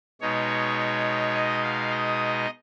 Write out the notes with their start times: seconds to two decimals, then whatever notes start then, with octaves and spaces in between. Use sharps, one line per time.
0.21 B2 G#3 D#4 C#5
1.34 D#5
1.63 F5
1.91 D#5